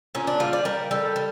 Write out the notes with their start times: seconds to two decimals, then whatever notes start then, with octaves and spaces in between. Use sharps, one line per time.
0.15 A#2 C#4
0.27 D4
0.40 G3 F4
0.53 D5
0.65 G3 A#4
0.91 G3 A4
1.16 G3